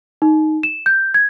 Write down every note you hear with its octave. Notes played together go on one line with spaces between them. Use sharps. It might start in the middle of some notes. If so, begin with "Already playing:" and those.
D#4
E7
G6
G#6